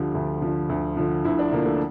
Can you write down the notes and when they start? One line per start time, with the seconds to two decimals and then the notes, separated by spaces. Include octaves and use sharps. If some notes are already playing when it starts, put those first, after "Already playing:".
Already playing: D2 D3 F3 G4
0.15 D2
0.42 D3 F3
0.69 D2
0.97 D3 F3
1.25 D2 E4
1.39 D4
1.52 D3 F3 A#3
1.65 A3